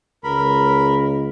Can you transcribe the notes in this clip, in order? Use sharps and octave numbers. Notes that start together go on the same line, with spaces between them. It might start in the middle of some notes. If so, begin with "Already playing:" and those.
C#2 A#4 B5